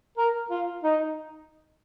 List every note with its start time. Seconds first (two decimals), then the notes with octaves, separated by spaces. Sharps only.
0.17 A#4
0.50 F4
0.83 D#4